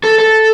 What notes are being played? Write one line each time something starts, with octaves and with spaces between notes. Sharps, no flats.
A4
A4